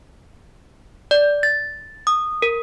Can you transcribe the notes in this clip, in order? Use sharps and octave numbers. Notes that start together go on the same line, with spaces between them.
D5
A6
D#6
A#4